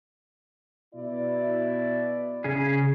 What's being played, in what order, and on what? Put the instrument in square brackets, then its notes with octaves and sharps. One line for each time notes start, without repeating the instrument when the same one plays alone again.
[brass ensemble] B2 E4 D5
[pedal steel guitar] C#3 C#4 G#4